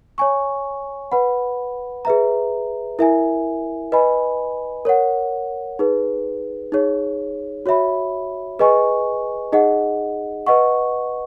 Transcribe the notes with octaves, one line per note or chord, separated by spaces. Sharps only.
C#5 G#5 C#6
B4 F#5 B5
G#4 B4 E5 A#5
E4 A#4 E5 G#5
B4 D#5 G#5 B5
A#4 C#5 F#5
D#4 G#4 B4
D#4 G#4 C#5
F#4 C#5 E5 B5
G#4 B4 D#5 G#5 C#6
D#4 G#4 D#5 F#5
B4 D#5 F#5 C#6